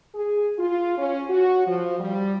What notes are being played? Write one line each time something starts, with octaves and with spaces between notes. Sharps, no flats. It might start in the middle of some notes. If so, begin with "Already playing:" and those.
G#4
F4
C#4
F#4
F3
G3